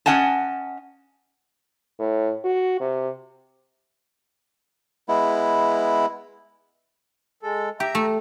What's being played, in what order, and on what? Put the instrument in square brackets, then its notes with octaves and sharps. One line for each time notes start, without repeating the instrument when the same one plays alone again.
[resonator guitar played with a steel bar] C#4 D#5 F#5 G#5 A5
[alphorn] A2
F#4
C3
[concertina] G#3 B3 E4
[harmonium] G#3 A4
[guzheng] G4 [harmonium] E5 A#5
[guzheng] A3